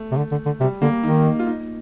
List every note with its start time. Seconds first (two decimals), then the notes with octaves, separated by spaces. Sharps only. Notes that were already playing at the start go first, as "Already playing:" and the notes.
Already playing: A3
0.12 C3
0.17 D3
0.31 D3
0.46 D3
0.60 C3 G3
0.82 D3 A#3
1.03 D#3 D#4
1.39 F4
1.47 D#4